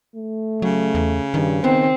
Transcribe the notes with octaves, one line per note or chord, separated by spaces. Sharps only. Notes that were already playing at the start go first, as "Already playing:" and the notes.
A3
C#3 F#3
E2
G2 D#3
D#3 B3 C4